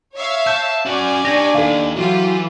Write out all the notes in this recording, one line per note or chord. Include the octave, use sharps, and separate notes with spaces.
C#5 E5 F5
A5 G6
C#4 F#4 D5 G#5
D4 G4 C#5 A#6
D#2 A4 F5
E3 F#3 F4 G4